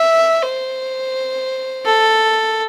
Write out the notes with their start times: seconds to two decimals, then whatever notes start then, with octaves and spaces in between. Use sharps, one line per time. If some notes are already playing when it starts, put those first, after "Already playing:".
Already playing: E5
0.43 C5
1.86 A4